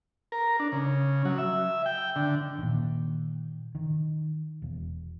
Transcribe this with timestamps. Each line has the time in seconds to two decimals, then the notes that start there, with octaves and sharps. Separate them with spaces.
0.32 A#4
0.60 D4
0.72 C#3
1.25 F#3
1.38 E5
1.86 G5
2.16 D3
2.59 A#2 D#3
3.75 D#3
4.62 E1